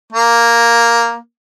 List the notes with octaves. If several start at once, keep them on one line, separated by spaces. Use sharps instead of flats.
A#3